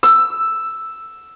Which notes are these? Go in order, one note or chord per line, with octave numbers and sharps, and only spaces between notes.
E6